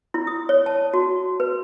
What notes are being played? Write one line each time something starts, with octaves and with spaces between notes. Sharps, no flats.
E4
D#6
C#5
A5
F#4
B4